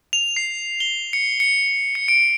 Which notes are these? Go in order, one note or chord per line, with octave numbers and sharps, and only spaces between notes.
F7
C7
G7
C#7
C#7
C#7
D7